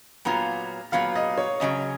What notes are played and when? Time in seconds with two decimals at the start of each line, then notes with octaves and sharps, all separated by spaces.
0.25 A#2 F#3 B3 F4 A#5
0.92 A#2 F#3 B3 F4 F5
1.15 D#5
1.38 C#5
1.60 F#2 C#3 F#3 D#5